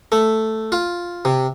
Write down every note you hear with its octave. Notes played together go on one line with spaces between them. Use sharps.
A3
F4
C3